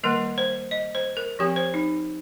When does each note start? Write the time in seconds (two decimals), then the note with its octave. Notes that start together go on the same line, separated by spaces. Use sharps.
0.04 D#3 G3 A#3 A#4
0.38 C5
0.71 D#5
0.95 C5
1.17 A#4
1.39 F3 C4 G4
1.56 C5
1.74 D#4